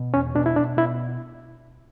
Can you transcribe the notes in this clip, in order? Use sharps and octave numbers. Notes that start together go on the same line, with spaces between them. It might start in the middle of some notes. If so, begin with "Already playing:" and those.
Already playing: B2
E2 C#4
B2 D4
E4
B2 D4
B2 E4